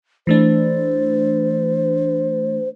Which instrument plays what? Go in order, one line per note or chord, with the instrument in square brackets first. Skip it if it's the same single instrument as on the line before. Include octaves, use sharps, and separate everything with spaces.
[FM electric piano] E3 A3 D4 [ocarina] C5